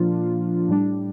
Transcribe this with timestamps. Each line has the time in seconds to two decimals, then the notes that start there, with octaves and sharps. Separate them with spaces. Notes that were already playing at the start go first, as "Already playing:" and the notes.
Already playing: A#2 F3 A#3 D4 F4
0.69 A2 G3 D4